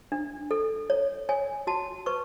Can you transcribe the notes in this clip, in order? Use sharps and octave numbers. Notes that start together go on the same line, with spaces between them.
D4
A4
C#5
C#5 G#5
F#4 A5
B4 C#6